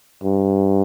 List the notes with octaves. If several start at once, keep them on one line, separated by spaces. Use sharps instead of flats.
G2